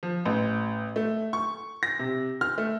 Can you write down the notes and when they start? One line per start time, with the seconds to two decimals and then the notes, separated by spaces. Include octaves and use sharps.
0.03 F3
0.25 A1
0.96 A3
1.33 C#6
1.83 A#6
1.99 C3
2.41 F6
2.58 A3